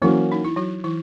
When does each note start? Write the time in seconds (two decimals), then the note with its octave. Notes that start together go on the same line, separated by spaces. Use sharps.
0.02 E3 F#3 A#3 C#4 E4
0.32 D#4
0.44 E4
0.56 F#3 F#4
0.84 E3 E4